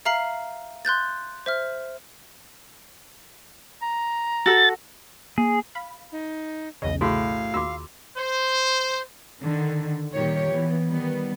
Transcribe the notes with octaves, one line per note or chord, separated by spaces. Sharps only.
E5 F5 A#5 F6 C7 F#7
C6 F#6 G6 A6
C5 E5 F6
A#5
F#4 A4 A6
A#3 G#4
F5 B5
D#4
B1 E2 C#3 D#5
A2 F#4 G#4 F5
D#2 F4 F#4 D6 E6
C5
D3 D#3
A#2 D#3 G3 G4 C#5
E3 B3
D#3 G3 B3